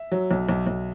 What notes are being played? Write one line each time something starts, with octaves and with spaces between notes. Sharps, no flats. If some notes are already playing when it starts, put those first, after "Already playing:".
Already playing: E5
F#3
B1
B1
B1